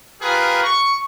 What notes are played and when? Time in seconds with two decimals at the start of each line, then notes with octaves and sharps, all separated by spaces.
0.21 F4 G4 G#4 A#4 B4
0.64 C#6